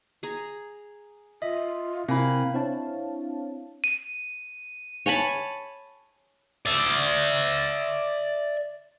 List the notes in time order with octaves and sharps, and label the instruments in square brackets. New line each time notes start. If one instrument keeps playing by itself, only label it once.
[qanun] G#4 A#5
[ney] F4 [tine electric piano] D#5 [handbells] E5
[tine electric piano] C3 [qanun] A#3 [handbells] C4 G#5 B5 [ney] E4
[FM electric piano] C4 D4 E4 C#5 F5 A5
[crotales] D#7
[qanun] C#5 G#5 A5 B5
[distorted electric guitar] D5 E5